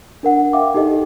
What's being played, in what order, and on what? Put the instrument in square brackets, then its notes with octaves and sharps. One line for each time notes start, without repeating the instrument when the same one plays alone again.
[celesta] D4 A#4 F#5
E5 F5 G5 D6
D#4 G4 A4 D#5